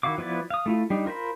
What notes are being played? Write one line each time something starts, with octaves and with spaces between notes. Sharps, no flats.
D#3 E4 F#4 F5 D6
F3 B3 E4 B4 D5
F5 D#6
A3 E4 F4
G3 D4 D#4
F4 A#4 C5 B5